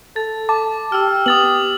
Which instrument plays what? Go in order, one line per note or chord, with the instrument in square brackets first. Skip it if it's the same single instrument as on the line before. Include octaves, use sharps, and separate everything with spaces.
[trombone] A4 [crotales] A6
[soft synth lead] A5 [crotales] D6
[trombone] G4 [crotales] E6 F6
[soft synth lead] B3 [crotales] D#6 A6 F#7